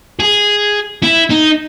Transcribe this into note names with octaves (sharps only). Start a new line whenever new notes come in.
G#4
E4
D#4